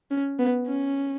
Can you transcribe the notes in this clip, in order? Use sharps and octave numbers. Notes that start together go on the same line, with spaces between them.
C#4
B3
C#4